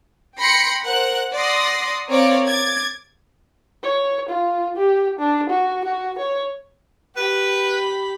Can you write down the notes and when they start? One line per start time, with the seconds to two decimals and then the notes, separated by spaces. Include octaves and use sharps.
0.38 G5 B5 C6 A#6 C7 C#7
0.84 A#4 C5 F#5 F#6
1.33 D5 F#5 C6 D#6 A#6
2.09 C4 A#4 C#5 D5 F5 D6
2.46 D6 G#6 A6
3.84 C#5
4.29 F4
4.77 G4
5.19 D4
5.49 F#4
5.85 F#4
6.19 C#5
7.16 G4 B4 B5